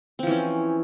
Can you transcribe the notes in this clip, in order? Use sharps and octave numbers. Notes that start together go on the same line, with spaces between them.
E3 F3 C4 C#4